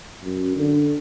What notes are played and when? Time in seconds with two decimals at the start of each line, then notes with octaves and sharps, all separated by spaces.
0.24 F#2
0.57 D3